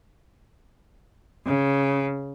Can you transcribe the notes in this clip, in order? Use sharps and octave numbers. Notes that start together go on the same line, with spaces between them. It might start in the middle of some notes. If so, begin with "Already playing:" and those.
C#3